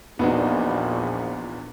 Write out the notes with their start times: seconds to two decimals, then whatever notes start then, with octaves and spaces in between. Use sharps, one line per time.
0.19 A#1 E2 A#2 B3 D4 D#4 F#4